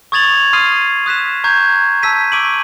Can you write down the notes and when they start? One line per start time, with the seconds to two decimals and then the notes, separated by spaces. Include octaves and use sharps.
0.12 C#6 D#6 G#6 A6 F7 F#7
0.53 C6 D#6 F6 C7 D#7
1.06 D#6 F#6 B6 E7
1.44 A#5 C#6 G6 G#6
2.03 A5 E6 B6 D#7
2.32 C#6 D6 D7 D#7 F#7